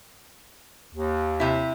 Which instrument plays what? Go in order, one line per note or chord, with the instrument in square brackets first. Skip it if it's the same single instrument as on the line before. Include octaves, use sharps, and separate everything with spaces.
[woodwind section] D#2
[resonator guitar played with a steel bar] C3 E4